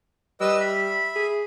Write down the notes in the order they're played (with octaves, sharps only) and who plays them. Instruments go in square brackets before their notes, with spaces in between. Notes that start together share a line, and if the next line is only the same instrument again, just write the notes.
[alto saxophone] G3 [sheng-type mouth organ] B4 D#5 E6
[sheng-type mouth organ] E5 B5
[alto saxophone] G#4